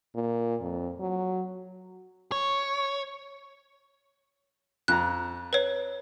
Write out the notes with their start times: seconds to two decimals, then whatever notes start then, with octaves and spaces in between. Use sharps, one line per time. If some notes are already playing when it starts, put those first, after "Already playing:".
0.15 A#2
0.61 F2
1.00 F#3
2.32 C#5
4.88 F2 A#5 F#6
5.53 B4 C#5